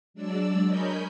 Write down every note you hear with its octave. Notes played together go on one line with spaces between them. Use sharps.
F#3 G#3 D4 D5 E6
A#4 C#5 D#5 G#5 B5 G6